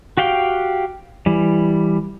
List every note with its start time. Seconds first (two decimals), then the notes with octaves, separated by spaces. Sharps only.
0.17 F#4 G4 F5 G5
1.26 E3 G3